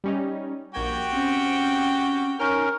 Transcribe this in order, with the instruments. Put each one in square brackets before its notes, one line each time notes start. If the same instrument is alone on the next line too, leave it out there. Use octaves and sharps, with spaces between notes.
[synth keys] G3 C#4 D#4
[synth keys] A#1 A#3 G#6 [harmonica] F#4 G4 G5
[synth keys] C4 [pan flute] C#4
[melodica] C#4 A#4 [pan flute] D#4 [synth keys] F6 G6